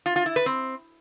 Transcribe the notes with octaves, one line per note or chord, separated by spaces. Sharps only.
F4
F4
E4
B4
C4